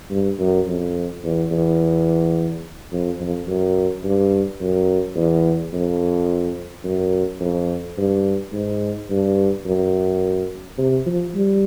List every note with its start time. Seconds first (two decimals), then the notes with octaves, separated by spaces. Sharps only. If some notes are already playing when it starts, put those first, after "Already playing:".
0.11 G2
0.40 F#2
0.68 F2
1.24 E2
1.51 E2
2.92 F2
3.20 F2
3.48 F#2
4.04 G2
4.60 F#2
5.16 E2
5.73 F2
6.84 F#2
7.40 F2
7.98 G2
8.53 G#2
9.10 G2
9.66 F#2
10.78 C3
11.06 F3
11.35 G3